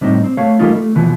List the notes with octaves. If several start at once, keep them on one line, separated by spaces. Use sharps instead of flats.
A2 G3 C4 D#4
C4
A3 C#5 F5
E3 G3 A3 A#3 D#4 F4
A3
D#2 B2 E3 F3